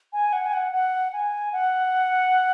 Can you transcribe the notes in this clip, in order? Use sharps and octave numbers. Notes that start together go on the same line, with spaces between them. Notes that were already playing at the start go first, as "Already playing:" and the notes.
G#5
F#5
G#5
F#5
F#5
G#5
F#5